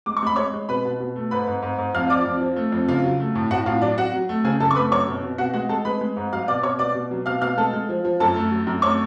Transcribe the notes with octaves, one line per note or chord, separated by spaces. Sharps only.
G#3 D6
C#6
G#3 B5
G#3 C#5 C#6
G#3
B2 B4 B5
B2
B2
A3
G#2 B4 B5
G#2
G#2
G#2
F2 F5 F6
F3 D5 D6
F2
F3
A3
F2
C#3 F4 F5
F#3
A3
A2
A2 F#4 F#5
A2 F4 F5
F#3 D4 D5
F#3 F#4 F#5
F#3
A3
C#3 G#4 G#5
F#2 A4 A5
C#6
A3 B4 B5
F#2 C#5 C#6
B2
B2
B2 F#4 F#5
G#3 F#4 F#5
G#3 A4 A5
G#3 B4 B5
G#3
G#2
F#3 F5 F6
B2 D5 D6
B2 C#5 C#6
B2 D5 D6
B2
F#3
B2 F5 F6
B2 F5 F6
G#3 A4 A5
G#3
F3
F3
F#2 A4 A5
A3
F#3
F#2
A3 C#5 C#6